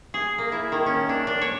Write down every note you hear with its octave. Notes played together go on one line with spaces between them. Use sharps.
G#4
A#3
E4
D#3
C#4
D4
D4
C#5